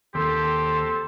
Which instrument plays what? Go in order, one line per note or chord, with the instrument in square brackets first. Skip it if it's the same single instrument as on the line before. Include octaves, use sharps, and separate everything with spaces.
[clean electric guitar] D#2 [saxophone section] C4 A4 [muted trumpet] G4 [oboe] C6